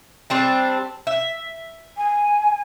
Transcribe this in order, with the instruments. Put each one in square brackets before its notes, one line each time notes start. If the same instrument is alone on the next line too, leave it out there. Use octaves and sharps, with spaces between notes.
[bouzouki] G3 C4 D4
E5
[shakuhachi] G#5